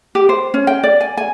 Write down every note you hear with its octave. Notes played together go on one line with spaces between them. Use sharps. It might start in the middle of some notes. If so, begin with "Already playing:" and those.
G4
C5
C#4
G5
D5
G#5
G#5